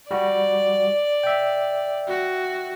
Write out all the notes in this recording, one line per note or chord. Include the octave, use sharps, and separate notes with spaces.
G3 F#4 D5
E5 G5
F#4